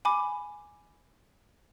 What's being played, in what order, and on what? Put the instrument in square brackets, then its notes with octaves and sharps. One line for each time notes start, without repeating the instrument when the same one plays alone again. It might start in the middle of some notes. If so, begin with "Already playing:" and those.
[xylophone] G#5 B5 D6